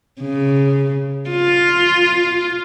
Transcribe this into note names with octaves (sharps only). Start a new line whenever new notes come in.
C#3
F4